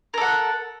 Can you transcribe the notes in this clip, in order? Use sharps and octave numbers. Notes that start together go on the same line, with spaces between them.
A4 A#4 F#5